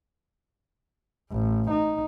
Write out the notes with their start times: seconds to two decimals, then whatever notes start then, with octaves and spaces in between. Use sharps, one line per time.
1.31 A1
1.70 D#4